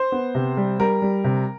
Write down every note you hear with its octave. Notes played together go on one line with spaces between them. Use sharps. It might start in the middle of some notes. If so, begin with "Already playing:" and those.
Already playing: C5
B3
C3
G3
G3 A#4
G3
C3